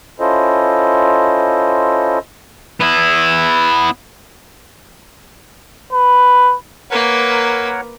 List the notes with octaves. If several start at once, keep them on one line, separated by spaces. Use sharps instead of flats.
C#4 E4 F4 A4 C5 D#5
B3 E4
B4
A#3 A#4 B4 C#5 F#5